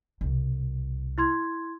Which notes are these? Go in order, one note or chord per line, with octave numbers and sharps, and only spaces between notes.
C2 B2
E4 C6 G#6